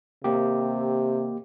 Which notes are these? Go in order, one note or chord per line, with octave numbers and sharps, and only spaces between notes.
C3 A#3 G4